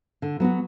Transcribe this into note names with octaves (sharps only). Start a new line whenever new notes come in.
D3
F#3 B3 F#4